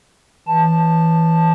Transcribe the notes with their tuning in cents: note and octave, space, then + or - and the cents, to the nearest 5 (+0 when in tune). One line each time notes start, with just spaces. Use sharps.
E3 -5 A5 +0